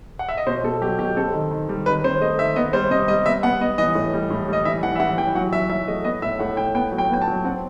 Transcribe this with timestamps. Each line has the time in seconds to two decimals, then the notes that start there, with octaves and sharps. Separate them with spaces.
0.19 F#5
0.29 E5
0.37 D#5
0.47 B2 C5
0.64 B2 A4
0.81 F#3 G4
0.99 B2 G4
1.16 C4 A4
1.33 D#3
1.51 D#3
1.69 G3
1.86 D#3 B4
2.04 C4 C5
2.21 A3 D#5
2.39 D#3 E5
2.56 B3 D#5
2.73 G3 C5
2.91 C3 D#5
3.08 G3 D#5
3.26 B3 E5
3.43 B3 F#5
3.61 B3 D#5
3.78 E3 D#5
3.95 A2
4.13 G3
4.30 A2
4.48 G3 D#5
4.65 E3 E5
4.83 E3 F#5
4.96 E5
5.00 E3 F#5
5.18 E3 G5
5.35 F#3 F#5
5.53 F#3 E5
5.70 F#3 E5
5.88 A3 D#5
6.04 B3 D#5
6.22 A2 E5
6.39 A2 F#5
6.57 A2 G5
6.75 B3 G5
6.92 F#3
6.98 G5
7.09 B3 G5
7.22 A5
7.27 F#3
7.44 C4 F#5